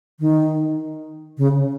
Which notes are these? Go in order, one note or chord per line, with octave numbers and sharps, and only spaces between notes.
D#3
C#3